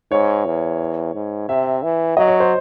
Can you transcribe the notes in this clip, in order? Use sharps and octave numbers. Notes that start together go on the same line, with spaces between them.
G#2 C#5
E2
G#2
C3 E5
E3
F#3 D#5
C#5
C5